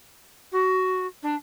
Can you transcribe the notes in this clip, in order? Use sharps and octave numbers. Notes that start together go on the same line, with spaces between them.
F#4
D4